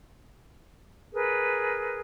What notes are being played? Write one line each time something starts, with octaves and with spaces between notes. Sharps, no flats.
G#4 A#4 B4